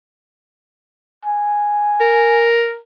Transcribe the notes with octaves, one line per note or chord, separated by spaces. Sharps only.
G#5
A#4